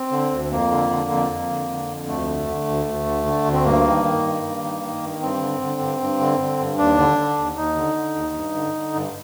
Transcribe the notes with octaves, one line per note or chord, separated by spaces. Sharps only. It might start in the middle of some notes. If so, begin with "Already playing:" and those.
Already playing: C4
D3
D2
F2 A#3
D3
D3
F2
F2
D3
D3
F2
D2 A3
D3
D3
D2
D2
D3
D3
D2
C4
G2 A#3
D#3
D#3
G2
G2
D#3
D#3
G2
G2 C4
D3
D3
G2
G2
D3
D3
G2
D#2 D4
D3
D3
D#2
D#2 D#4
D3
D3
D#2
G2
D3
D3
G2